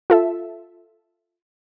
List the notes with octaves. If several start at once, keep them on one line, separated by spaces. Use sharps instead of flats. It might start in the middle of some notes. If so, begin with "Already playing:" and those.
F4 A4 E5